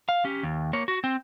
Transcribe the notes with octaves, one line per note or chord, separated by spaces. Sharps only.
F5
C#4 G4
D#2
A#3 C#5
F#4
C4